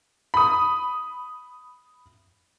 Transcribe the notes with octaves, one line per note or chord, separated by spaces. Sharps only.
B5 D#6